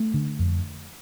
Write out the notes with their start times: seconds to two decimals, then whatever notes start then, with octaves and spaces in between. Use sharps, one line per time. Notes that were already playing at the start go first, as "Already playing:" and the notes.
Already playing: A3
0.14 D3
0.39 F2